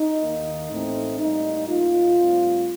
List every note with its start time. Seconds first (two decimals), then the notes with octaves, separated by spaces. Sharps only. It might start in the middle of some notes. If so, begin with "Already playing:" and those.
Already playing: D#4
0.21 D#2 D#3 A#3
0.70 A1 A2 A3 C4
1.19 A2 G3 A#3 D#4
1.68 D#2 D#3 A#3 F4
2.18 A2 G3 C4